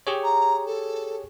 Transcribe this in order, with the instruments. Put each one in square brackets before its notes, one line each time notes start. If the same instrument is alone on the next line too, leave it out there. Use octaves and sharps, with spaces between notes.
[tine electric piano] G4 G#4 C#5
[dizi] A#5
A4